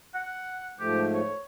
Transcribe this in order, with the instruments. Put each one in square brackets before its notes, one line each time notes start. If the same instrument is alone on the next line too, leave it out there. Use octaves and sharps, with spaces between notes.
[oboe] F#5
[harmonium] G#2 F3 A3 [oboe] G4
[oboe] C#5